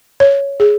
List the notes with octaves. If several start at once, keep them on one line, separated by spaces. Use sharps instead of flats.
C#5
G#4